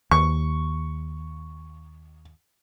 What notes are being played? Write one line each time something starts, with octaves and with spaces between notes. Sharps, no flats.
D#2 C#6